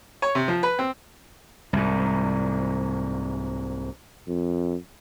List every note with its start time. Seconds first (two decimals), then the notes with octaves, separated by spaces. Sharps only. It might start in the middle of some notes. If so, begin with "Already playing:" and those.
0.22 C#5
0.35 C3
0.48 F3
0.63 B4
0.79 C4
1.73 C2 G#2
4.28 F2